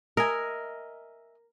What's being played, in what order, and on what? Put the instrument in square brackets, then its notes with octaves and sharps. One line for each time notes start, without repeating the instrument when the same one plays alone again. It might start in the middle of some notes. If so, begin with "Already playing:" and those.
[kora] A#4 [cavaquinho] D#5 E5 G#5